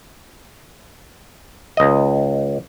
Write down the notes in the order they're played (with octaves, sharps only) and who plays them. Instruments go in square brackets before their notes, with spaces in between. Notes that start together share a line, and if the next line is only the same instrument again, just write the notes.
[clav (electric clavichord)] C#2 D#5